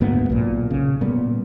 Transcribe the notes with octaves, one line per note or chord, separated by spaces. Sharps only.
D2 G#2 A#3 B3
B1 A#2
C#3
A#2 G3 B3